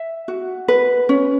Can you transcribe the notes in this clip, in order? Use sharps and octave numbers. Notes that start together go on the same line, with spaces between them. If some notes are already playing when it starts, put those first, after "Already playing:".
Already playing: E5
F#4
B4
C#4